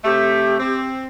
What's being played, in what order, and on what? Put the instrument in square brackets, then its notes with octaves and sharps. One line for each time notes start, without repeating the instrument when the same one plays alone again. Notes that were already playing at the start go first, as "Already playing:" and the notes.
[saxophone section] C3 A3 [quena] G4
[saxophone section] C4